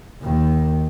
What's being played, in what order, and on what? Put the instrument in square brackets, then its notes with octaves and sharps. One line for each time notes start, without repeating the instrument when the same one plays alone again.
[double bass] D#2 D#3